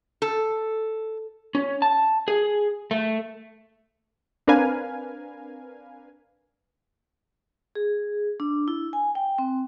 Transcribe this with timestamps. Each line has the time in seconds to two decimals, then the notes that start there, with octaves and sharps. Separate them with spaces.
0.22 A4
1.55 C#4
1.82 A5
2.28 G#4
2.91 A3
4.47 C4 D4 A#4 B4 F5 G#5
7.75 G#4
8.40 D4
8.68 E4
8.93 G#5
9.15 G5
9.38 C4